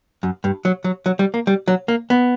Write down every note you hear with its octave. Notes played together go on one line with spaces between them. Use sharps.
F#2
G2
F#3
F#3
F#3
G3
A#3
G3
F#3
A#3
B3